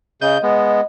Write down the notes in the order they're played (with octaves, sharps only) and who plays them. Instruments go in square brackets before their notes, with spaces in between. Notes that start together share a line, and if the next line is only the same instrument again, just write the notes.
[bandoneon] C#3 G6 [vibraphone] D#5
[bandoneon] G#3 B3